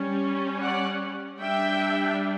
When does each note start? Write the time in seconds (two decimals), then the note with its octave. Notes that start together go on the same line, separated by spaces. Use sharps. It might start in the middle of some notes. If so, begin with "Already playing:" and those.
Already playing: G3 C#4
0.61 D5 F#5
1.40 G3 D4 E5 G5